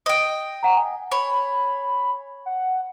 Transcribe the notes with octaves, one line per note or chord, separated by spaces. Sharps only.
D#5 G5
F#5 A#5
G#5
C#5 B5
F#5